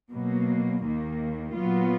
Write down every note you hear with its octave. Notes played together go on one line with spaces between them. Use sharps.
B2 F#3 A#3
D#2 D#3 A#3
A#2 F#3 B3 F4